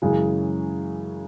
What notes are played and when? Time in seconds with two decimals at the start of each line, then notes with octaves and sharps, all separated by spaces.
0.02 F#2 C#3 E3 G#3